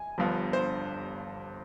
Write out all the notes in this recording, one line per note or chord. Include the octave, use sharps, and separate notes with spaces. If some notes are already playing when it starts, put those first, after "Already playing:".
Already playing: G#5
G1 G2 F3 B3
C5